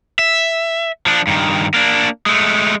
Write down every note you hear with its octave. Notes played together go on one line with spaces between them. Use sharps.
E5
F3 D4
G2 D#3
A#3 D4
G#3 A3